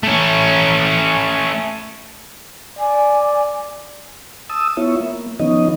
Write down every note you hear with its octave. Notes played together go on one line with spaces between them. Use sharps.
A3 C#4
D5 G#5
A5 D#6 E6
B3 E4 F4 C#5 E5
A#3
D#3 F3 B3 C#4 D#4 D#5